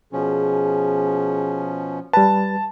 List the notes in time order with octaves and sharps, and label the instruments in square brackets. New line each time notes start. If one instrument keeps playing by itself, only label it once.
[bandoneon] B2 F3 C#4 [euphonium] G#4
[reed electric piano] G3 B4 [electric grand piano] A5